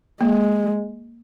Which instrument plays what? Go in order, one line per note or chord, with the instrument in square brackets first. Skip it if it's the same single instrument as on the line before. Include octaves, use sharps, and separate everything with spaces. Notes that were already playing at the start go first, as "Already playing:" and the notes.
[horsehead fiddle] G#3 [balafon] A#3